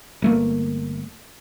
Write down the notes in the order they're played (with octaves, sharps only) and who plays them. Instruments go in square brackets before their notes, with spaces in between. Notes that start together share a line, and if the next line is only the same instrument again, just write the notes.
[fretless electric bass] G1 A3 A#3